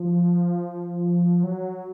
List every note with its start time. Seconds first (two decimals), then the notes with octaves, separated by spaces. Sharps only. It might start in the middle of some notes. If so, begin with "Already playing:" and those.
Already playing: F3
1.43 F#3